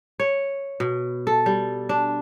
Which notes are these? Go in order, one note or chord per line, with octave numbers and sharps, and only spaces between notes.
C#5
B2
A4
G3
D4